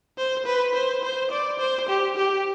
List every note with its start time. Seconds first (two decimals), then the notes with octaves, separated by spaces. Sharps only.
0.18 C5
0.46 B4
0.75 C5
1.03 C5
1.31 D5
1.59 C5
1.88 G4
2.17 G4